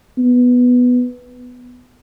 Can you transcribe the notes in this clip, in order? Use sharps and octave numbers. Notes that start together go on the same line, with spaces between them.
B3